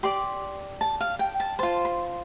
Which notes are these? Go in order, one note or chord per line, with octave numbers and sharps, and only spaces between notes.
G4 D5 C6
A5
F5
G5
A5
F4 C5 A5
C6